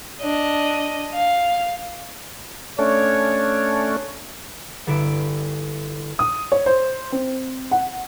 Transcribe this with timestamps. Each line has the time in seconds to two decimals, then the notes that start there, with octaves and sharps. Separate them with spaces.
0.22 D4 D#5
1.13 F5
2.79 A3 C#4 D4 C#5
4.87 G1 D3 E4 D7
6.19 D#6
6.52 C#5
6.66 C5
7.12 C4
7.71 F#5